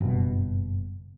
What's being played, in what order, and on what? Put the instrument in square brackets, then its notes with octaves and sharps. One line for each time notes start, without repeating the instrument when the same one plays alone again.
[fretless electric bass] F#1 G2 B2